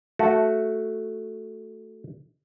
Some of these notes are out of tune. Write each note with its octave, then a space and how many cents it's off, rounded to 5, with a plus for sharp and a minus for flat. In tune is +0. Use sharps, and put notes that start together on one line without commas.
A3 +0 F#4 +0